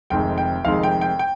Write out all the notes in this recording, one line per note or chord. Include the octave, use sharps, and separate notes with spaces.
F1 F2 D#3 G#3 G5
G5
F1 F2 D#3 G#3 F5
G5
G5
G5